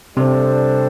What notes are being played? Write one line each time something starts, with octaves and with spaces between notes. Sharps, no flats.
C3 G3 D4 A4 C5